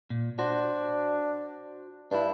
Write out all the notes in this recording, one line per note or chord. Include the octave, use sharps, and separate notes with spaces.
A#2
D4 F#4 C5
G2 D4 E4